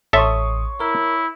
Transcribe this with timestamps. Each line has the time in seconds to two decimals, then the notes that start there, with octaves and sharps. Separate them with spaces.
0.13 A1 A4 C#5 E5 C6 C#6 D#6
0.80 E4 A#4